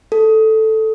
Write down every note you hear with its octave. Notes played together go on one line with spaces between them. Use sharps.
A4